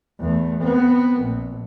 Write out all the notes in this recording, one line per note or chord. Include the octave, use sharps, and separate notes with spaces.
E2 A3
B3 C4
A#1